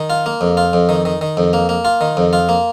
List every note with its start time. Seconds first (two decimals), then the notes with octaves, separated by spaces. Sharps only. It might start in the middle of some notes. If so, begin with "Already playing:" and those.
Already playing: D#3
0.10 F4
0.26 A#3
0.41 F2
0.57 F4
0.73 F2
0.89 D#3
1.05 D#3
1.21 D#3
1.37 F2
1.53 A#3
1.69 A#3
1.85 F4
2.01 D#3
2.17 F2
2.33 F4
2.49 A#3